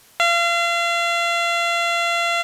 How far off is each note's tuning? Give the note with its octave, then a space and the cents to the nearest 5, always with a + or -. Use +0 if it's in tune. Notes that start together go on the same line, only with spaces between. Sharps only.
F5 -35